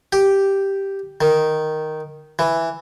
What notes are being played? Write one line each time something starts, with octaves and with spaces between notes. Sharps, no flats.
G4
D#3
E3